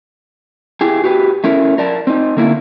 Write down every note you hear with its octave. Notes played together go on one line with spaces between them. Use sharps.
E4 G4 G#4
F#4 G4 B4
A3 C#4 E4 A#4
A#4 D5 A5
C4 D#4
D3 A#3 E4